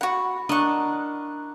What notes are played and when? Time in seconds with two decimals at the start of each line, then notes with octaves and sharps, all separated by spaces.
0.01 F#4 F#5 B5
0.49 D4 A#4 D#5 F#5 C#6